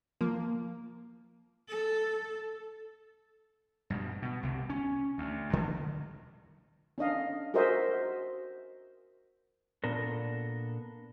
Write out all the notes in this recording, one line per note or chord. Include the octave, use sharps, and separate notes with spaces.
F3 A#3
A4
G2 B2
B2
C2 C3
C#4
D2
G2 D3
C#4 D4 D#5 F5
F#4 G#4 A#4 C5 D#5 E5
A#2 B3 D4 A4 A#4